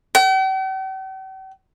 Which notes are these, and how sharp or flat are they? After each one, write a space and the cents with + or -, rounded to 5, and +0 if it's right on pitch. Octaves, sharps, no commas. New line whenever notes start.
G5 -45